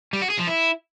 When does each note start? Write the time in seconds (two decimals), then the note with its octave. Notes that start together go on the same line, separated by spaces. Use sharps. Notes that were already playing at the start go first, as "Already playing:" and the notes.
0.13 G3
0.22 F#4
0.30 G#4
0.39 F3
0.47 E4